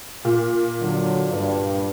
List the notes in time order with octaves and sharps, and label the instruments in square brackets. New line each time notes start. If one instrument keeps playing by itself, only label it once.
[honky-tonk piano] A#2
[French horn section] D3 F#3 D4
G2